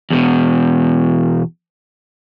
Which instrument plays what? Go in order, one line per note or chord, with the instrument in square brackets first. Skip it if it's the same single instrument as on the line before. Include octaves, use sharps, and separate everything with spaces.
[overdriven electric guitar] E2 B2